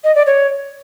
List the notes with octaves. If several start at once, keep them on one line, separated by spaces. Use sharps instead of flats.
D#5
D5
C#5